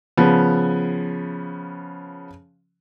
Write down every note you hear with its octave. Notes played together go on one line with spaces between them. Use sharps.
C#3 F3 B3